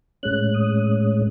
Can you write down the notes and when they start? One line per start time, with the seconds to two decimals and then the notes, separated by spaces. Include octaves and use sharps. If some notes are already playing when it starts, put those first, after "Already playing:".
0.23 A2 G#3 C#4 F#6
0.54 D#6